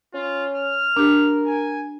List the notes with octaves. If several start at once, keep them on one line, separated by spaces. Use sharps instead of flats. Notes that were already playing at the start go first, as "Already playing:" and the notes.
C#4 F4
F6
D4 G4 A#4
G#5